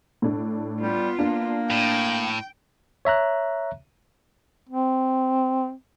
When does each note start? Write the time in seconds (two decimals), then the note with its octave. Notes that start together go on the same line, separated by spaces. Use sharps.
0.22 A2 D4
0.81 G3 B3 F4
1.19 A#3 D4
1.70 A2 G5
3.05 C#5 E5 A#5 F#6
4.69 C4